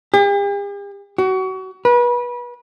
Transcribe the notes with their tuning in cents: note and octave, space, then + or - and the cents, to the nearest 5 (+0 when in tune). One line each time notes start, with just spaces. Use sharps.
G4 +45
F#4 +30
B4 -30